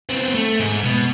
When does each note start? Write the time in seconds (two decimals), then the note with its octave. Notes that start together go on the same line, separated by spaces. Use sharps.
0.09 B3 C4
0.34 A3
0.59 G#2
0.84 B2